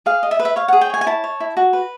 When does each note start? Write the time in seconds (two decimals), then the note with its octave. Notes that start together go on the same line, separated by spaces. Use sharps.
0.06 G#4 F5
0.23 D#5
0.31 E5
0.39 B4
0.45 E5
0.56 C#5 F5
0.68 G#4 F#5
0.81 G5
0.90 C#5 G#5
1.01 G#5
1.07 E4 A5
1.24 C#5
1.40 E4
1.57 F#4
1.73 B4